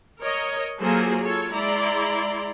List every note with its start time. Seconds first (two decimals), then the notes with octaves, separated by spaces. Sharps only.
0.19 A#4 C#5 D#5
0.80 F#3 A#3 F4 G#4 A4 C5
1.23 F4 A4 C#5
1.52 G#3 E4 D5 A#5 C6